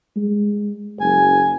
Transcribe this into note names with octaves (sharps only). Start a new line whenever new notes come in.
G#3
F#1 G#5